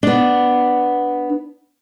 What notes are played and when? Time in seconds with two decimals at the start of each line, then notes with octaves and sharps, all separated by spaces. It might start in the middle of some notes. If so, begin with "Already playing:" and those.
0.03 B3 D4